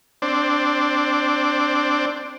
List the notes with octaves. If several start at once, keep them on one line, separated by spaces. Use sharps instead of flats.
C4 D4